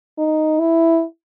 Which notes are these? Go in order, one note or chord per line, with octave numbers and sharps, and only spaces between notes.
D#4
E4